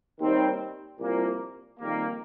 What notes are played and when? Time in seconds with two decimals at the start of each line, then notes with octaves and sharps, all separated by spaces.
0.19 D#2 D#3 G3 C4
0.99 C2 A#2 F3 A#3
1.79 F2 D#3 G3 A#3